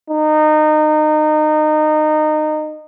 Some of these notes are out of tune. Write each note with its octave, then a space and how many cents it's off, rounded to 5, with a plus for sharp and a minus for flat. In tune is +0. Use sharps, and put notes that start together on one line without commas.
D#4 -25